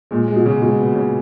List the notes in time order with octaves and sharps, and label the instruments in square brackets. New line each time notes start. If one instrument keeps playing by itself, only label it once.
[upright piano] A#2 [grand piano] G#3
[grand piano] G#3
[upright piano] B2
[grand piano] C#3
[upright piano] B2 [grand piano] G#3
[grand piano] B3
C#3